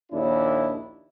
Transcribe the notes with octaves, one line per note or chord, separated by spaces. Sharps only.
A#1 D#2 D4 E4